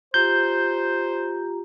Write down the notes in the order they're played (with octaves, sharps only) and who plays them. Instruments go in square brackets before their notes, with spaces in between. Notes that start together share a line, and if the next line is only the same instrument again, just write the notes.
[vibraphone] F4 G4 A#5 [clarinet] C5 [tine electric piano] G6